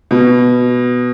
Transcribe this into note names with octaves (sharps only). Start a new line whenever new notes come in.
B2